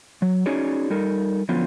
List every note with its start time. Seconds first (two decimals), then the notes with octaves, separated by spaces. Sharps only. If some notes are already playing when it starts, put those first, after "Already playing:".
0.22 F#3
0.46 C#4 D#4 F#4 G#4 C#5 D5
0.90 G3 D#4 A4 A#4
1.49 D3 F3 F#3 B3 C#4 F4